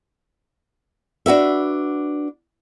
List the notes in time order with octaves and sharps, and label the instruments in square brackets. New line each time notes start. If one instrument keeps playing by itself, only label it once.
[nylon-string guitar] D4 F#4 B4 E5